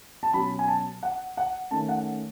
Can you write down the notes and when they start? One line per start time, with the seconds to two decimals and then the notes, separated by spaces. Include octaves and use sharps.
0.23 A5
0.33 B2 F#3 C#4 B5
0.59 G#5
0.68 A5
1.03 F#5
1.37 F#5
1.71 D#3 A3 C#4 A5
1.89 F#5